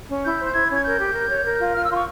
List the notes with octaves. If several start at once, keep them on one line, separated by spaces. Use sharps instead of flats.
C#4
E4 G6
C5
G6
E4 G#6
C#4 G#6
A#4 G6
G4
A#4
C#5
A#4
F4
F4 F6
E6
F4 C6
C#6